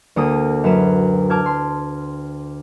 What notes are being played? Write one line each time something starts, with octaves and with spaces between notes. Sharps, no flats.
D2 A#3 A4 D#6
F#2 B4 E7
A5 D6 E6 F6 G#6
C6